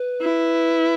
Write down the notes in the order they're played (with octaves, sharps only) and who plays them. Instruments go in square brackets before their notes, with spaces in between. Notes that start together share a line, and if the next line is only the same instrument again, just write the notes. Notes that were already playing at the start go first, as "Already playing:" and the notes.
Already playing: [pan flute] B4
[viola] E4